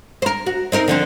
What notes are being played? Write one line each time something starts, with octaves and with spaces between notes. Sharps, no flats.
A#4 C5
F#4
C4 D#4 A#4
D3 F3 C4